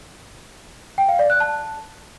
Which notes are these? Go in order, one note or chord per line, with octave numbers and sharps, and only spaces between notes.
G5
F5
D5
F#6
A5